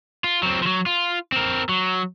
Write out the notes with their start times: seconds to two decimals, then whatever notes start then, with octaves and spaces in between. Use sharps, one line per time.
0.24 F4
0.43 F#3 C4
0.62 F3 F#3
0.86 F4
1.32 C4 A#4
1.69 F#3